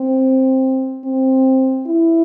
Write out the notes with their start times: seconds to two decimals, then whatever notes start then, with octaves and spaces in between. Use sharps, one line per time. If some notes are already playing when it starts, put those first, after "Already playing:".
Already playing: C4
1.04 C4
1.86 E4